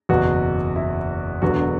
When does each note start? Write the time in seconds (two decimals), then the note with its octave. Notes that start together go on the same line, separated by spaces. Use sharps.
0.09 F#1 E2 B2 F#3 B3 F#4
0.76 E4
1.42 E1 E2 D3 F#3 B3 F#4